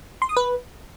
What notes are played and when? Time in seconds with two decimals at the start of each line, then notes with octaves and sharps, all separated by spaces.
0.22 C6
0.29 D#6
0.37 B4